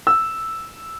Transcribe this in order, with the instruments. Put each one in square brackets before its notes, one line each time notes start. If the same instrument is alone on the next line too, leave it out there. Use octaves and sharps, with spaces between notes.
[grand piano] E6